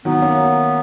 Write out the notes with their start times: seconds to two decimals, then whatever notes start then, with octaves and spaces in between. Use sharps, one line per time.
0.05 D#3 F#3 B3
0.22 A#3 C#4